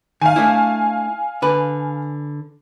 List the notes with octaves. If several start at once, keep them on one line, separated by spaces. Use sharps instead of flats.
D#3 F5 G#5
A3 D4 E4
D3 B4